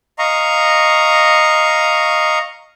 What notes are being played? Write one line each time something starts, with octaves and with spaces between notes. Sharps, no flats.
D#5 F5 A#5 C#6